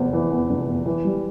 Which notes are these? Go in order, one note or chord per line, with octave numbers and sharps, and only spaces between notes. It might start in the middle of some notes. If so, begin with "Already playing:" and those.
Already playing: F1 E2 C5
E3
E2
F1
E2
E3
G3